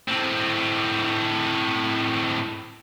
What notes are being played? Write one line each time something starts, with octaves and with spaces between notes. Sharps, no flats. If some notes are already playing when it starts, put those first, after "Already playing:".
A2 C4